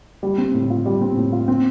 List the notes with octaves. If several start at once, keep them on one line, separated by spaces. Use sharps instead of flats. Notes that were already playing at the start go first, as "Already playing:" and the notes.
G3
C4
A2
F4
G3
C4
A2
F4
C4